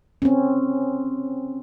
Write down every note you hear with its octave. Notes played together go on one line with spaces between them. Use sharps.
C4 C#4